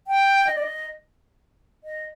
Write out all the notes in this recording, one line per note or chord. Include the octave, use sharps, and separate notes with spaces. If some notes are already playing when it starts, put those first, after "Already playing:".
G5
D#5
D5
D#5
D#5